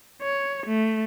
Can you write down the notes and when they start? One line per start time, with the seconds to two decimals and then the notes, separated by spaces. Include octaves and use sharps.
0.22 C#5
0.67 A3